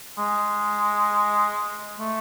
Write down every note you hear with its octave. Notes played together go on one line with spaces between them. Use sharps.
G#3
A3